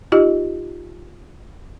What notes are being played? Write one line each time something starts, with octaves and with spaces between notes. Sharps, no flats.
D#4 F4 G4 D#5